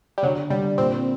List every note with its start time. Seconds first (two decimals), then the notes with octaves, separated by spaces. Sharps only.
0.18 G3
0.23 D3 F#3
0.50 D3 G3
0.78 A#2 C4